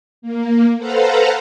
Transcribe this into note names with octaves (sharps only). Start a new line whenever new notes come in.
A#3
A4 B4 C5 F5 F#5 A#5